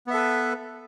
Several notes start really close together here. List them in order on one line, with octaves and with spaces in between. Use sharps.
B3 E5 A4 B4